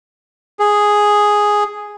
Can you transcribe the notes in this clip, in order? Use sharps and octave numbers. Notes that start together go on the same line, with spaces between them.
G#4